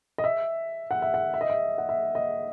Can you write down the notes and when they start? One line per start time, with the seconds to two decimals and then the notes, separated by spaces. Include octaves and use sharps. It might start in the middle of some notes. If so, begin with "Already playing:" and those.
0.18 D#5
0.24 E5
0.91 F#5
1.02 E5
1.14 F#5
1.34 E5
1.41 D#5
1.50 E5
1.78 F#5
1.89 E5
2.15 D#5